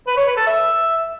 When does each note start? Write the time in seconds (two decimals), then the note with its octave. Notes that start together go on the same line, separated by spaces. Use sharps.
0.07 B4
0.17 C#5
0.27 B4
0.37 A4
0.47 E5